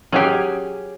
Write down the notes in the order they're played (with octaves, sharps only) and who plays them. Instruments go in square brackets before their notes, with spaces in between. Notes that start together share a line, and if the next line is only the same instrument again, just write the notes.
[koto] F#3 G4 [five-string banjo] C#4 G#4 G#5